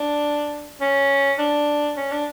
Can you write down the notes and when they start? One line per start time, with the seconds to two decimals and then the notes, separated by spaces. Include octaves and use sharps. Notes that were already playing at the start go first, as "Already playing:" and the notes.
Already playing: D4
0.81 C#4
1.38 D4
1.97 C#4
2.11 D4